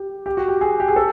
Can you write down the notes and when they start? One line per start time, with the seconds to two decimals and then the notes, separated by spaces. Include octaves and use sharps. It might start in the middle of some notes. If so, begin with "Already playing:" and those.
Already playing: G4
0.26 G4
0.37 F#4
0.48 G4
0.61 G#4
0.80 G4
0.88 G#4
0.96 A4